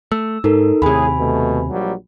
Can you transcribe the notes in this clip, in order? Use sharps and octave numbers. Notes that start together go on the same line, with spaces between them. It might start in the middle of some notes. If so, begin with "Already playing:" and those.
A3 E6
G#2 D#4 A4 A#4
D#2 A2 C3 G#4 G#5 B5
B2 A3
A#1 F#3 G3